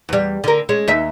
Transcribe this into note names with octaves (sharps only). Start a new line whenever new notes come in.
E2 G3
D3 A#4
G#3 C#4
D#2 D#4 E5